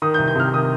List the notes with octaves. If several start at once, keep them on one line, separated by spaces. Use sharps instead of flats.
D#3 D#6
G6
C2
G6
C3 F6
D#3 D#6